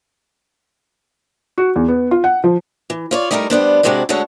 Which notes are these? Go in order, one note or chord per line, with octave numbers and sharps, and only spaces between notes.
F#4
E2
B3
F4
F#5
F3
E3
F4 C#5 D5
G3 A3 D#4 E4 G#4 A#4
G3 B3 D4 C5
C3 G#3 C4 D4 E4 F#4
D2 D3 G#3 A4 C#5 F#5